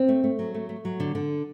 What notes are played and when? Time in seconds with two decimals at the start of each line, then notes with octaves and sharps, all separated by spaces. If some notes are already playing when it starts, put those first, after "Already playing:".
Already playing: C4
0.09 A3
0.24 A3
0.39 F#3
0.55 A3
0.69 A3
0.85 F#3
1.00 D3
1.15 D3